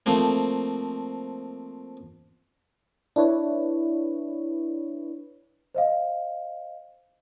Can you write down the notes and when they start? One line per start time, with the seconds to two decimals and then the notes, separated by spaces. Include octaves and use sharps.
0.06 F3 A3 A#3 C4
3.16 D4 E4 B4 C#5
5.74 C5 D#5 F5